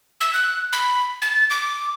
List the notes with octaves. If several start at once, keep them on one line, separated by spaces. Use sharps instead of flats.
E6
F#6
B5
A6
D6